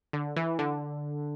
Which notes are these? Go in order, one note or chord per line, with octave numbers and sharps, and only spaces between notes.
D3
E3
D3